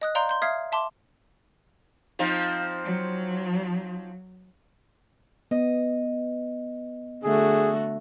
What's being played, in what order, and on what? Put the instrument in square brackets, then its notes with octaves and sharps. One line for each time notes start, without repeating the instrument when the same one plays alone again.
[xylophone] D#5 D#6 F#6
D5 F5 A#5 C6 G6 D7
C6 G6
E5 F5 D#6 F6 G#6 C7
E5 A5 C6 D6
[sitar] F3 C4 D#4
[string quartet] F#3
[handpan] B3 [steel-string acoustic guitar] D#5
[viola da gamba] D3 A3 F#4 [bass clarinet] G#4